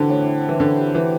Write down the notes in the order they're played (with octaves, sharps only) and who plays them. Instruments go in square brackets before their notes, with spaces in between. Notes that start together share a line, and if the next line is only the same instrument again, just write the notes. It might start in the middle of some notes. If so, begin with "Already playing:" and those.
Already playing: [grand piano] D3 E3 [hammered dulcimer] C4 D4 F#4
[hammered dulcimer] A2
E4
A4
[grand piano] E3
[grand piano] D3 [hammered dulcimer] E4
[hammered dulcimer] G4
[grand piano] E3 [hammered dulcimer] F#4